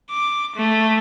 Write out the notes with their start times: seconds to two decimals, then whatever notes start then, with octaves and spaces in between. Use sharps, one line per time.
0.11 D6
0.55 A3